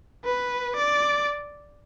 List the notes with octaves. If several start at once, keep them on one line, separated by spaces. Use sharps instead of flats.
B4
D5